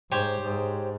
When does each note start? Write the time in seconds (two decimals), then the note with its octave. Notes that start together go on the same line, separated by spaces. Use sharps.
0.11 G#2 G4 C5 C#5
0.41 G#2